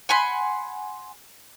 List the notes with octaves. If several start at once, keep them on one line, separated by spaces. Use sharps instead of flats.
F#5 G#5 B5 C6